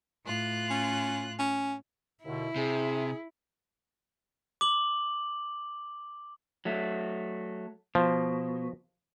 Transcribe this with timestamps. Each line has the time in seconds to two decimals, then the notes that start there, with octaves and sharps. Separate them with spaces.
0.24 A2 F4 F#6
0.70 C#4
1.39 C#4
2.24 D#2 B2 D3 E4
2.56 C3 G#4
4.61 D6 F#7
6.65 F#3 A3
7.95 B2 F3